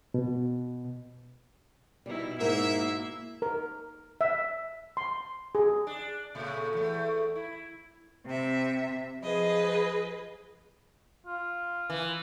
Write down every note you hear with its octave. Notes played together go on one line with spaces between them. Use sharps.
B2
B2 G3 D#4 E4
G#2 A#3 E4 F#4 A#4 E5
A#4
E5
C6
G#4
D4
A#2 C#3 A3
E2 A3
E4
C3 E5
F3 G#4 B4 D#5
F4
E3